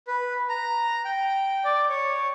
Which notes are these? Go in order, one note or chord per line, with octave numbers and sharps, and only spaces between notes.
B4
A#5
G5
D5
C#5